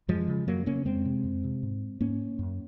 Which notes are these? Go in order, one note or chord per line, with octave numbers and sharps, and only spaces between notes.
F#2 F3 G#3
C#3
F#2 F#3 A#3
C#3 A#3 C#4
F2 G#3 C4
C3
F2
C3
G#2
G#2 A#3 C#4
F#2